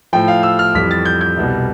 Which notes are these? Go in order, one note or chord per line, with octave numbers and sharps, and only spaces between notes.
A2 F3 G5
F5
E6
F6
F2 E3 G3 B6
A6
G6
G6
C2 B2 G3